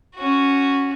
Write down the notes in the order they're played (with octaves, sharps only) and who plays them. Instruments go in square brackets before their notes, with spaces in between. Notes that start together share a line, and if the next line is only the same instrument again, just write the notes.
[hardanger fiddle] C#4 F#4